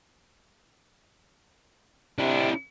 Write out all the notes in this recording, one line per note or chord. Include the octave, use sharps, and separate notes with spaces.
C3 D4 E4